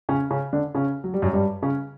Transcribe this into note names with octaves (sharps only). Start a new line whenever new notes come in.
C#3 C#4
C#3 C#4
D3 D4
C#3 C#4
F#3
G3
F#2 F#3
G2 G3
C#3 C#4